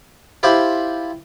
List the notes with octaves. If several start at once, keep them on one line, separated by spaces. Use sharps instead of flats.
E4 F4 G4 C5 B5